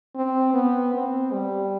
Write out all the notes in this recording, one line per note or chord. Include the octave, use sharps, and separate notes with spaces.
C4
B3
C4
G3